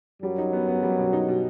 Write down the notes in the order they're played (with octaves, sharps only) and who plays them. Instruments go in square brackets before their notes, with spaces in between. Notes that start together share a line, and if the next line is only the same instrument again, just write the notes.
[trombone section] F#2 F#3 [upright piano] G3
[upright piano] D#4
B3
B3
G3
B2
D#4
B2